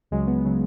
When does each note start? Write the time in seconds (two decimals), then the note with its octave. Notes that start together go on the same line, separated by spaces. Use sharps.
0.11 C#2 C#3 F#3 G#3
0.27 B3
0.45 C#3 F#3